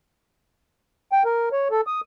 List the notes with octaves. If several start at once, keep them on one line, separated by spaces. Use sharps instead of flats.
G5
A#4
C#5
A4
D#6